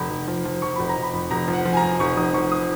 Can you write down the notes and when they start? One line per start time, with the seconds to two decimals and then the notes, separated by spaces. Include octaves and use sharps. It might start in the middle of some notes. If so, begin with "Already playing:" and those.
Already playing: F1 B5
0.10 F1
0.28 F3
0.45 F3
0.62 F3 C#6
0.76 F1 B5
0.89 A#5
0.97 F1
1.03 B5
1.14 F2
1.31 F1 A#5
1.48 F3
1.54 F#5
1.65 F3
1.73 G#5
1.77 A#5
1.82 F3
2.00 F1 C#6
2.17 F1 D#6
2.34 F3 C#6
2.52 D#6